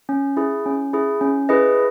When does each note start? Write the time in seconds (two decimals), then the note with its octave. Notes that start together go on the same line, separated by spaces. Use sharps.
0.09 C#4
0.37 E4 G#4
0.66 C#4
0.93 E4 G#4
1.21 C#4
1.49 E4 G#4 B4 D#5